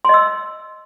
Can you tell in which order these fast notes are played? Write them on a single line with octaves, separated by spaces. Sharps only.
C6 D#5 E6